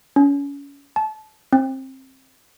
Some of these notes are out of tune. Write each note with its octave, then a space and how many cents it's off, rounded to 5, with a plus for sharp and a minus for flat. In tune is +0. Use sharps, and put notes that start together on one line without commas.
C#4 +30
A5 -25
C4 +25